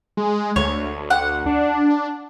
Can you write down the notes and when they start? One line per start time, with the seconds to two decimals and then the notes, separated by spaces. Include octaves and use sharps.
0.17 G#3
0.56 D2 C#5
1.10 F#5
1.46 D4